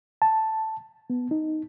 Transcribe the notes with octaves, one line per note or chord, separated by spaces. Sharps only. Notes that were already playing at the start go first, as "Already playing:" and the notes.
A5
B3
D#4